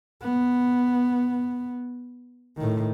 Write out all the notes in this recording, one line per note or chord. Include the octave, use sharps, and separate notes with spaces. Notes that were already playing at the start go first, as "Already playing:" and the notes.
B3
A2 D#3